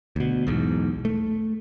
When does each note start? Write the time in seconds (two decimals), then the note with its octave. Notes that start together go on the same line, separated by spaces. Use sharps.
0.16 D2 B2
0.47 B1 E2 G#2
1.05 A3